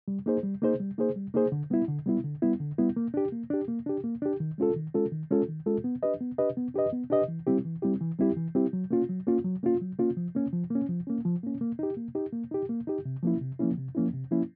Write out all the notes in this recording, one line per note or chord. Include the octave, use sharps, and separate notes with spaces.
G3
A#3 D#4 G#4 C5
G3
A#3 D#4 G#4 C5
G3
A#3 D#4 G#4 C5
G3
A#3 D#4 G#4 C5
D3
G3 B3 E4
D3
G3 B3 E4
D3
G3 B3 E4
D3
G3 B3 E4
A#3
D4 G4
A#3
D4 G4
A#3
D4 G4
A#3
D4 G4
D#3
G#3 C#4 F4 A4
D#3
G#3 C#4 F4 A4
D#3
G#3 C#4 F4 A4
D#3
G#3 C#4 F4 A4
B3
D4 G4 B4 D#5
B3
D4 G4 B4 D#5
B3
D4 G4 B4 D#5
B3
D4 G4 B4 D#5
E3
G3 C4 E4 G4
E3
G3 C4 E4 G4
E3
G3 C4 E4 G4
E3
G3 C4 E4 G4
F#3
A#3 C#4 F4
F#3
A#3 C#4 F4
F#3
A#3 C#4 F4
F#3
A#3 C#4 F4
F3
A#3 C#4
F3
A#3
C#4
F3
A#3 C#4
F3
A#3 C#4
A#3
D#4 G4
A#3
D#4 G4
A#3
D#4 G4
A#3
D#4 G4
C3
F3 A#3 C#4 E4
C3
F3 A#3 C#4 E4
C3
F3 A#3 C#4 E4
C3
F3 A#3 C#4 E4